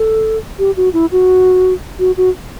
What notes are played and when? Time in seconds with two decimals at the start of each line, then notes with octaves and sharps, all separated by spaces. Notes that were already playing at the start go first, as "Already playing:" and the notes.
Already playing: A4
0.59 G4
0.77 F#4
0.93 E4
1.12 F#4
1.99 F#4
2.17 F#4